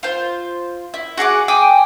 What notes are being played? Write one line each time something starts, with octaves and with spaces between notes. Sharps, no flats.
F4 C5
E4
F#4 G#4 F#5 D6
G5 G#5 D6 D#6